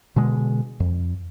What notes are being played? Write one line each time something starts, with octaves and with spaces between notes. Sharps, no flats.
B2 D3 G#3
F2